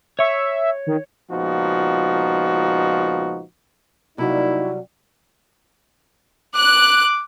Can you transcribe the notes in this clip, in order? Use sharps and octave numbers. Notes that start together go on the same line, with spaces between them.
C#5 E5 C#6
D#3
C#2 A#2 F3 B3 D#4 F#4
C3 F#3 G3 A#3 D#4 E4
D6 F#6